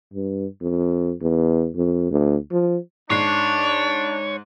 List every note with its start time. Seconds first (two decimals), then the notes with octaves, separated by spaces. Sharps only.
0.14 G2
0.62 F2
1.21 E2
1.76 F2
2.11 D2
2.52 F3
3.10 G#2 D4 C#5 C7